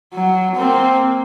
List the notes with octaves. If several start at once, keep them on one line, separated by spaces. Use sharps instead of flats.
F#3
A#3 C4